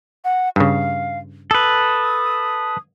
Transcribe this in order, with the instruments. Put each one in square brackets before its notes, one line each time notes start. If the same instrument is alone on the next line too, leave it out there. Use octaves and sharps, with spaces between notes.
[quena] F#5
[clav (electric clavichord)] G2 C#3 [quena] F5
[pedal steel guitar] A4 B4 [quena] D#6